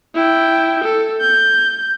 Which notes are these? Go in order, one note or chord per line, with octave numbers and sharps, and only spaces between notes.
E4 G5
A4
G6